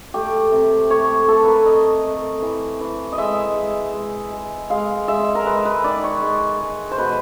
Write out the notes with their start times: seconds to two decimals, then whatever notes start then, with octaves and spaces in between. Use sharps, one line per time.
0.14 A3 G4
0.52 C3
0.90 A3 C#5
1.28 A3 A4
1.43 A#4 B4
1.66 C3 D#5
2.04 A3
2.42 E3
2.81 E3
3.12 D#5
3.18 G#3 E5
3.56 G#3
3.94 G#3
4.32 G#3
4.70 G#3 F5
5.08 G#3 E5
5.35 A#4
5.46 G#3 B4
5.65 B4
5.84 D#3 D5
6.04 C#5
6.22 G#3
6.60 G#3
6.91 C5
6.98 B2 B4